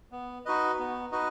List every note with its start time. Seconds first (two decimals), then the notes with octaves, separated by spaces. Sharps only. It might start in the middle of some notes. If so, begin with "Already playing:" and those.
0.12 B3
0.45 D#4 F#4 B4 D#5
0.79 B3
1.12 D#4 F#4 B4 D#5